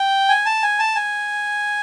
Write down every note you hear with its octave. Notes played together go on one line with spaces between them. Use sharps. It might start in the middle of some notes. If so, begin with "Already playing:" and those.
Already playing: G5
G#5
A5
G#5
A5
G#5